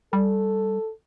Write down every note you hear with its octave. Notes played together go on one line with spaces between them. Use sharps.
G3 A4